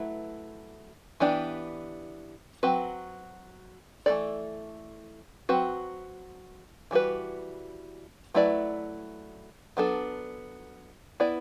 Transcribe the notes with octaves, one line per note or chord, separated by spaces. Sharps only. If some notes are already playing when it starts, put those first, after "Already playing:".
Already playing: F#3 A3 E4 B4
E3 B3 D4 G4
F#3 C4 F#4 B4
E3 A3 E4 A4 D5
F#3 C4 F#4 B4
E3 G3 B3 F#4 B4
F#3 A3 E4 B4 D5
F#3 B3 D4 A4
B3 E4 B4 D5